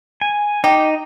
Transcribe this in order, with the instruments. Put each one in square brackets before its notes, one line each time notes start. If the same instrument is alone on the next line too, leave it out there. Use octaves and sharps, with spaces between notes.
[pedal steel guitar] G#5
[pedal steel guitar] D#4 [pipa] G4